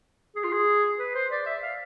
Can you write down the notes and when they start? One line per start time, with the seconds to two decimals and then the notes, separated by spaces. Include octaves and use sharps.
0.36 G#4
0.44 F4
0.52 G#4
0.99 B4
1.15 C5
1.31 D5
1.46 E5
1.63 F5